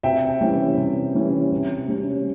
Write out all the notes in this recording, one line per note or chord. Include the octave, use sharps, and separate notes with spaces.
C3 E5 G5
E3 G3 C#4
C3
E3 G3 C#4
C3
G3 C#4